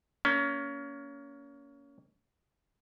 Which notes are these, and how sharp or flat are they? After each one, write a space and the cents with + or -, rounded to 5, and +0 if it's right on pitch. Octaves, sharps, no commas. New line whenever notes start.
A#3 +0 C#4 +25